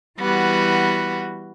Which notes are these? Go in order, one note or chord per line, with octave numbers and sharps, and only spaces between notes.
E3 G3 B3 F#4